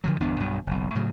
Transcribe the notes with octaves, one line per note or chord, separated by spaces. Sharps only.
D3 F3 F#3
G1 E2 B3 D4
B1 G2 B2
F#1 B1
A2 C#3 F#3